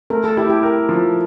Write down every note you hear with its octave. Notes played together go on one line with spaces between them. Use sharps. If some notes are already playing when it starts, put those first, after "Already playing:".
A3 A#4
A4
E4 G4
G4
A#4
F3